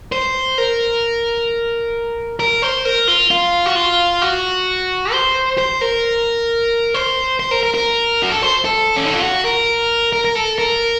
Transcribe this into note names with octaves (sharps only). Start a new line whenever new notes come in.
C5
A#4
A#4
C5
A#4
F4
F4
F#4
F4
F#4
C5
C5
A#4
C5
C5
A#4
A#4
A#4
F#4
A4
C5
A4
C#4
D#4
F4
F#4
A#4
A#4
A#4
A4
A#4